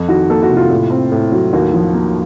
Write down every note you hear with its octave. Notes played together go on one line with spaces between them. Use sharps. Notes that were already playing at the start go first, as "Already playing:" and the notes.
Already playing: F2
D#3 F#4
A#3 A4
F#4
C3
F4
A2
C4
A2
F#3
D#2 F#4
F3
A#3